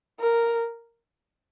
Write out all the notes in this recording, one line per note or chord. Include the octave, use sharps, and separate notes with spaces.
A#4